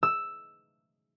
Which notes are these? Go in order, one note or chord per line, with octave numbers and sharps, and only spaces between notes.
E6